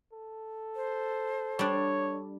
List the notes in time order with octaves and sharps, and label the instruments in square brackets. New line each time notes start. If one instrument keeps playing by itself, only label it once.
[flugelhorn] A4
[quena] C5
[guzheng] G3 D4 [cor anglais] C#5